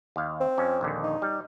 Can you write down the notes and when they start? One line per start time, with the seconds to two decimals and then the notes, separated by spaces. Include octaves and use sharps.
0.16 D#2 F5
0.40 C4
0.58 F2 C#4
0.81 A#1 D#2 D3
1.03 D#4
1.22 G3